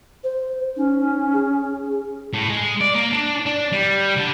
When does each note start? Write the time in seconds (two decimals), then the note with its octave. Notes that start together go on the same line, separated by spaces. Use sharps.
0.24 C5
0.76 C#4 D#4
1.33 G#4
2.33 A2
2.49 G#3
2.81 D5
2.95 A#3
3.13 D4
3.46 D4
3.72 G3
4.16 D3